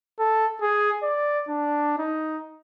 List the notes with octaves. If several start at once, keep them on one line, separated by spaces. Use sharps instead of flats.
A4
G#4
D5
D4
D#4